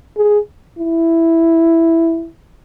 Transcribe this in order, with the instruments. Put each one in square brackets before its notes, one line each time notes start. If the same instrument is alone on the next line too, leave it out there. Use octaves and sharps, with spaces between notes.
[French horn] G#4
E4